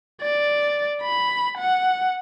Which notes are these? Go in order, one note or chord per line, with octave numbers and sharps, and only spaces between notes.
D5
B5
F#5